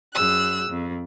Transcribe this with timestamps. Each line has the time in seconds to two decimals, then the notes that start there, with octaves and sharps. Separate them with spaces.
0.14 F#2 G#4 E6 F#6
0.70 F2